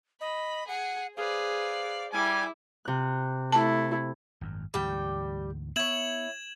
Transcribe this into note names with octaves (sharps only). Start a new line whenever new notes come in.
D#5 B5
G#4 F#5
G#4 B4 C5 D5 F5
G3 E4 G#5 D6
C3 F#6
A3 E4 A5
G#1 F#2
D2 G#2 E3 G3 G5
B3 E4 C#5 G#6 E7 F#7